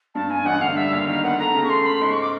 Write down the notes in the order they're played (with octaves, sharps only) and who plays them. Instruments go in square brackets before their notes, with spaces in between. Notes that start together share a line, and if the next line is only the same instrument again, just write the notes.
[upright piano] G2 [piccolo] A5
[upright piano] G2 [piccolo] G#5
[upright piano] A1 [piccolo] F#5
[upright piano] D3 [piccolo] F5
[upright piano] G3 [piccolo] E5
[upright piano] D#2 [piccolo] F5
[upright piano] D#3 [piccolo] F5
[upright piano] B3 [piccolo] F#5
[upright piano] A3 [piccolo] A#5
[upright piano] C#3
[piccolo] C#6
[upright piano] A3 [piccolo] C6
[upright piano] C#3 [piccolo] B5
[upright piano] G#2 [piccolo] C6
[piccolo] C#6
D6